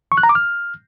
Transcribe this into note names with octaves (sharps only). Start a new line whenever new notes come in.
C#6
F#6
A#5
D6
F6